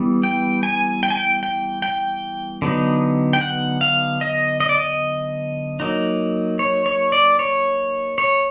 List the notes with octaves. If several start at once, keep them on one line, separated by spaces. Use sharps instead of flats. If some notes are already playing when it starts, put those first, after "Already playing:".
Already playing: E3 G3 B3
G5
G#5
G5
G#5
G5
G5
G5
D3 F#3 B3 D#4
G5
F#5
F5
D#5
D#5
D5
D#5
F#3 A#3 D#4
C#5
C#5
D5
C#5
C#5